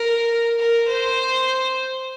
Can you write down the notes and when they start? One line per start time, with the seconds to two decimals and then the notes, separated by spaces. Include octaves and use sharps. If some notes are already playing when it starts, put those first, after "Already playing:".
Already playing: A#4
0.59 A#4
0.87 C5